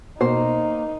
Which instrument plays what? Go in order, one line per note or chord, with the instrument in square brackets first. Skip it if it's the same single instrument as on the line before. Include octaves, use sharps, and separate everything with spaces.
[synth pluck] B2 [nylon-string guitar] A#3 C5 [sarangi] D#4